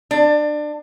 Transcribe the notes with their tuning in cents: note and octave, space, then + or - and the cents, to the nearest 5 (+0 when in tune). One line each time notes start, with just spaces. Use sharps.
D4 +25